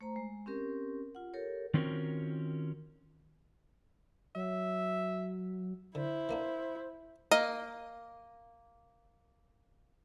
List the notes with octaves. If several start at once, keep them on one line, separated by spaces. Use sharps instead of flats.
A3 C5 A#5
G#3
C4 C#4 G4 A#4
F4 F#5
G4 A4 A#4 C#5
D#3 C4 C#4 F4 F#4 A#4
F#3 E5
D3 E4 C5
E3 A#3 D4
A#3 D#5